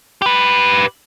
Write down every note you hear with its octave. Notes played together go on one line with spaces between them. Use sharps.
G4 B4